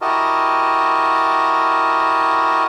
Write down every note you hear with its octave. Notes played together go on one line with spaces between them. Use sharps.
E4 F#4 G4 A#4 D#5 A5